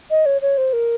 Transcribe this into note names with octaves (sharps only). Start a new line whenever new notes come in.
D#5
C#5
C#5
C5
A#4